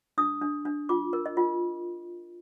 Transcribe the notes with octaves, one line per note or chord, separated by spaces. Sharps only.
D4 D#6
D4
D4
F4 D6
A#4
D#5
F4